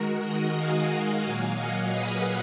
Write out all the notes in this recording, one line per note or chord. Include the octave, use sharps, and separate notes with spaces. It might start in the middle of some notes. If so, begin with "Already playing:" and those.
Already playing: D#3 G#3 F#4 A#4
D#5 F#5
F5 G#5
A#2 F#3 A#3 F5 G#5
D#5 F#5
G#4 B4